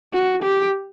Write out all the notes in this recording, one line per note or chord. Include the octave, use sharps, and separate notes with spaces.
F#4
G4